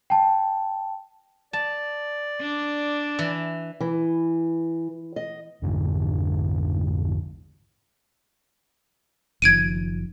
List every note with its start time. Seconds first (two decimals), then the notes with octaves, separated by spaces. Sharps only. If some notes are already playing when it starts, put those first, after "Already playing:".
0.10 G5 A5
1.53 D5 A5
2.41 D4
3.19 E3
3.80 E3
5.16 D#5
5.62 A#1 F2 G#2 D3
9.42 F#1 D#3 F3 G#6 D7 D#7